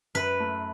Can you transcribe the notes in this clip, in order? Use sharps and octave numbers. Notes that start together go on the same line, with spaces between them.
F#2 B4
A3